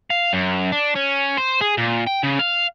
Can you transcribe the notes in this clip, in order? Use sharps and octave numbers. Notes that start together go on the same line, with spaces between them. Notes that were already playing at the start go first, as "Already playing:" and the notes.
F5
F#2
D4
C#4
C5
G#4
A#2
G5
C#3
F5